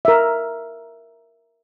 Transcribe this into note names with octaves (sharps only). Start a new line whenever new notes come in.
A#4 E5